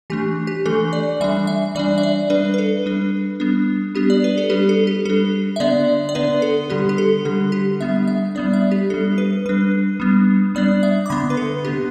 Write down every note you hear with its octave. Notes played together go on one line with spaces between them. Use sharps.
E3 A3 D4 G4
G4
E3 A3 D4 A4
D5
E3 G3 D4 E5
E5
E3 G3 D4 D5
E5
D5
G3 D4 B4
B4
A4
G3 D4
G3 B3 D4
G3 B3 D4 G4
D5
B4
A4
G3 D4 G4
A4
G4
G3 D4 A4
E5
D3 B3 D4 D5
D5
D3 B3 D4 B4
A4
D3 G3 D4 G4
G4
A4
D3 G3 D4 A4
G4
G3 B3 D4 E5
E5
G3 B3 D4 D5
E5
G4
G3 D4 A4
B4
G3 D4 B4
G3 B3 D4
G3 B3 D4 D5
E5
D6
D3 B3 D4 B5
B4
A4
D3 B3 D4 G4